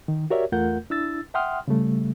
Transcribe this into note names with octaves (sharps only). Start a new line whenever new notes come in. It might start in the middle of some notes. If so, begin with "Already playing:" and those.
D#3
F#4 G4 A#4 C#5 D5 E5
E2 A3 F4 A#4 F#5 G6
D4 E4 E6 A6
E5 F#5 G5 C6 D#6 F6
C#3 G3 A3